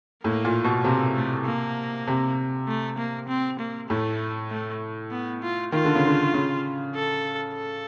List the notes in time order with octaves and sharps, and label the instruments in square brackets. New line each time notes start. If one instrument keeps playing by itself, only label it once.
[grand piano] A2 [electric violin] A#3
[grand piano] A#2
B2
[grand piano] C3 [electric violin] A#3
[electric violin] A3
A#3
[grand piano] C3
[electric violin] A3
A#3
C4
A#3
[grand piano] A2 [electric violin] A3
[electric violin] A3
B3
F4
[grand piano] D#3 [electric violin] F4
[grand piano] D3
C#3
D3
C#3
[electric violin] A4
A4